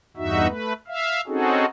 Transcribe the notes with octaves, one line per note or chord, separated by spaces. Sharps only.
E2 G2 D#4 F#4 E5
A3 B4
E5 F5
C4 C#4 D#4 F#4 G#4 A4